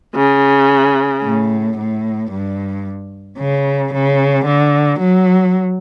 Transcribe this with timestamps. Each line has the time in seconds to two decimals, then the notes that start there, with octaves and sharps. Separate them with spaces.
0.16 C#3
1.23 A2
1.77 A2
2.30 G2
3.38 C#3
3.92 C#3
4.45 D3
4.98 F#3